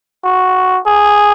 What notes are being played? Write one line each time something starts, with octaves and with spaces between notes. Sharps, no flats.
F#4
G#4